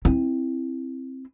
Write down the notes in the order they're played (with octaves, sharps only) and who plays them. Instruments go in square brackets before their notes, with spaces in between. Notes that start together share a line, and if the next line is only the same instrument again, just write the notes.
[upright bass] C4 E4